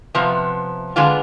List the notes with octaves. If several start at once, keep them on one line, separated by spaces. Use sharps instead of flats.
C3 F3 B3
D3 G#3 B3 D4 F4